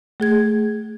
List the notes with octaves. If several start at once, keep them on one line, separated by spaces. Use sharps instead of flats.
A3 G#4 G#6